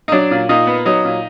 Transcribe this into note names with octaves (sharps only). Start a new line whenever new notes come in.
D#4
F#3 D4
A#2
A#2 D#4
B3
F#3 D#4
A#2